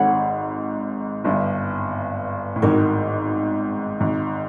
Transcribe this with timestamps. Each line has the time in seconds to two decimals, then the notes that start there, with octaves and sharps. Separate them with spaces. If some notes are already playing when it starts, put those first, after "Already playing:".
Already playing: G#1 G#2 A4 C#5 F#5 B5
1.24 G1 G2
2.56 A2
2.62 G#1 G#2 D#4 F#4 A#4 D#5
4.00 G#1 G#2